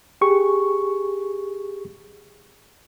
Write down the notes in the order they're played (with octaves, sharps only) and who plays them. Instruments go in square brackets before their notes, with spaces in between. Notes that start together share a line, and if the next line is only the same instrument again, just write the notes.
[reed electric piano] G4 G#4 C#6